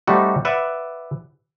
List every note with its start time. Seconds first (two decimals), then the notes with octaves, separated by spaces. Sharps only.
0.07 G3 A3 C4 D#4 F#4
0.45 B4 D5 E5 F#5